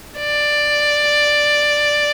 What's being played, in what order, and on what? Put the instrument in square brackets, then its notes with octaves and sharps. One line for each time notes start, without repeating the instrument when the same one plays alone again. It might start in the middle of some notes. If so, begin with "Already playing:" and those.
[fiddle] D5